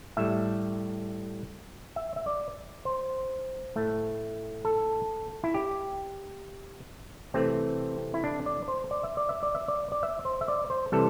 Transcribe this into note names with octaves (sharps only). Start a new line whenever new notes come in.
A2 G3 E5
E5
E5
D5
C5
A2 A3
A4
E4
G4
C3 E3 A3 C4
E4
D4
D5
C5
D5
E5
D5
E5
D5
E5
D5
D5
E5
C5
E5
D5
C5
C3 E3 G3 A4